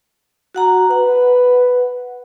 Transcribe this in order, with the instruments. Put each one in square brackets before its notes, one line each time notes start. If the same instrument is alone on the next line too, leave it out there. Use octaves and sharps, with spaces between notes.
[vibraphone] F#4 F#5 A#5
[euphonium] B4 [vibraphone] F#5